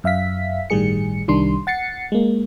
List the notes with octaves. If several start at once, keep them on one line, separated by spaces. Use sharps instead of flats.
F#2 E5 F5 B6
G1 A2 D#3 G3 G#4 C#7
C2 D#3 G3 D4 C6
F#5 A6 C7 C#7
G#3 A#3